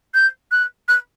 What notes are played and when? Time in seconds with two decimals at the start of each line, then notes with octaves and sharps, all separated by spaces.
0.14 G6
0.52 F#6
0.88 F#6